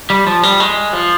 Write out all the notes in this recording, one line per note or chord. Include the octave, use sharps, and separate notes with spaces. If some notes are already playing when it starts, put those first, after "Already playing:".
G3
F3
G3
G#3
F3